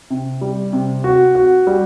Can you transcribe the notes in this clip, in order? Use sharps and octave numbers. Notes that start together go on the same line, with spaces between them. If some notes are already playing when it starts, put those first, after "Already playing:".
C3
G3
C3
F#4
F#4
G3